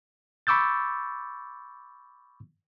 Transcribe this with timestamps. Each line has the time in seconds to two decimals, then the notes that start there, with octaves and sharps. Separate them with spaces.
0.47 B5 C#6 D6 E6 G6 A6